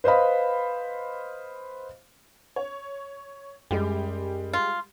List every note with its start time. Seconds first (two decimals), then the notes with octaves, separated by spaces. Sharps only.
0.04 B4 C5 D#5 F5 B5
2.56 C#5
3.71 F#2 G3 G#3 G4
4.53 F4